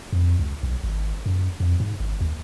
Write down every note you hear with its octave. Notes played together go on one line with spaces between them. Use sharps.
F2
C#2
B1
G#1
F#2
F2
G#2
G#1
D#2